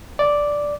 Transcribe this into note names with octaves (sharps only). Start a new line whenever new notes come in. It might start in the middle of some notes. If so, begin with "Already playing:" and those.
D5